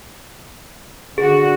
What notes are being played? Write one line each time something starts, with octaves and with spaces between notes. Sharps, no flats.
D3 F#4 G#4